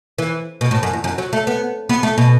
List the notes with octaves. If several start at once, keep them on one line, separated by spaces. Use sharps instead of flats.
E3
B2
A2
F#2
E2
F#2
F#3
A3
B3
B3
A3
B2